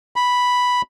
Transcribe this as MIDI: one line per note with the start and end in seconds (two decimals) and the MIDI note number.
0.16 0.82 83